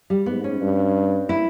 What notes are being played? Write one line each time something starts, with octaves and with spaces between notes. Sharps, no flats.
G3
G#2 B3
C#4
G2
E4